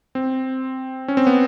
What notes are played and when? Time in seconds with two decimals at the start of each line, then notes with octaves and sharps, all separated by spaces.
0.15 C4
1.08 C#4
1.17 C4
1.27 B3